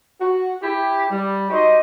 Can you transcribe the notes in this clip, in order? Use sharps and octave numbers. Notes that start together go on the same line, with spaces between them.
F#4
E4 G4
G3
D#4 F#4 G4 C5 D#5